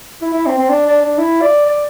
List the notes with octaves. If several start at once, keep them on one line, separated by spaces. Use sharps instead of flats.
E4
E4
C4
C4
D4
D4
D4
E4
D5
D5